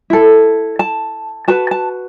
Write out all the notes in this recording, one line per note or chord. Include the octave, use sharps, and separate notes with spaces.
E4 A4
A5
F#4 B4 A5
A5